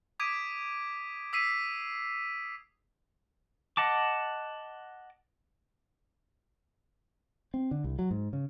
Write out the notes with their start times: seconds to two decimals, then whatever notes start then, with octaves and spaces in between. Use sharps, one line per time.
0.20 D6 D#6 G#6 B6 D7 D#7
1.33 D#6 E6 B6 C7 D#7
3.77 D#5 F#5 A5 D6
7.54 C4
7.71 D3
7.84 C2
7.99 F#3
8.11 G#2
8.33 C#3